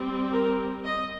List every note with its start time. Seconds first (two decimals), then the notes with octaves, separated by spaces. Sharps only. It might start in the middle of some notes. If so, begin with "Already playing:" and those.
Already playing: G3 C4
0.32 A#4
0.85 D#5